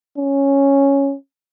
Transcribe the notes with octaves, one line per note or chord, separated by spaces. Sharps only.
C#4